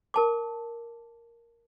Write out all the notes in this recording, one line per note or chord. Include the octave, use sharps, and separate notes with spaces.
A#4 A5 D6